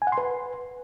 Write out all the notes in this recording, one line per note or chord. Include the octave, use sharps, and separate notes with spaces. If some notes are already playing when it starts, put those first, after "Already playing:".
G#5
F#5
C6
B4